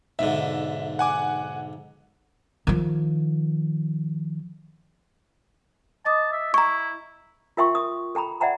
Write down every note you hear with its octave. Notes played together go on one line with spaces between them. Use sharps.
B1 G#2 D3 E5
F#5 G#5 D6
D#3 F3
D#5 A5 D6 D#6
E5
E4 A#5 C#6
F4 A#4 E5 G5 C6 C#6
D#6
A4 G5 A#5 B5
D5 E5 F#5 G5 A#5 B5